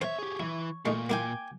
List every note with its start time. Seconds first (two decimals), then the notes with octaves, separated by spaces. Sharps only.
0.01 D#2 C5 C#5 E5
0.19 G4 G#4
0.40 E3 E4
0.85 A#2 G#3 A3 D#4 C#6
1.09 A#3 E4 G5 G#5 D6